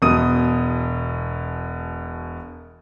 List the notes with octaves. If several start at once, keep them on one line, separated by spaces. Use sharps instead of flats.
E1 B2 D#6 D#7